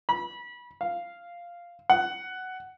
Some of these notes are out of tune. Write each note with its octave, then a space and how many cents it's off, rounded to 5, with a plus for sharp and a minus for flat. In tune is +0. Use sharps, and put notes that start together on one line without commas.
B5 -25
F5 -5
F#5 +10